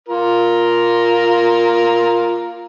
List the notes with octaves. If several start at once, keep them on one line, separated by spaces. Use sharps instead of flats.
F4 A#4